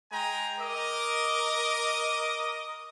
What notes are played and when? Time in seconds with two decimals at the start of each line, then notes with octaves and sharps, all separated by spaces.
0.11 G#3 G5 G#5 A#5
0.59 A#4 D#5 D6 D#6